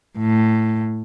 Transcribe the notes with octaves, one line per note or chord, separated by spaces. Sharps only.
A2